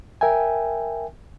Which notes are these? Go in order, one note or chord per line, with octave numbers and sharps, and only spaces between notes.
A#4 E5 G5 G#5